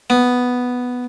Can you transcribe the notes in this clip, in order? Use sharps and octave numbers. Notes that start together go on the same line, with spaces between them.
B3